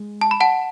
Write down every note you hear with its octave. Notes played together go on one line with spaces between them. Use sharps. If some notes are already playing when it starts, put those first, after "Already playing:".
Already playing: G#3
A5
B5
F#5 A5